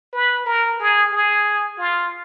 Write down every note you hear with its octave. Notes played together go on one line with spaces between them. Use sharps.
B4
A#4
G#4
G#4
F4